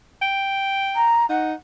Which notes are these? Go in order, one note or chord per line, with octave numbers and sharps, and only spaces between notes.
G5
A#5
D#4 F#5